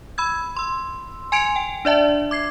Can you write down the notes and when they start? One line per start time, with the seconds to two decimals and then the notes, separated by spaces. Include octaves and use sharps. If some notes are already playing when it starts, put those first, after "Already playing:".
0.18 B5 E6 G#6
0.57 C6 E6
1.32 G#5 C6 G#6 C#7 D7 F7
1.56 G5
1.85 D4 D5 E5 A5
2.31 D6 G#6 C7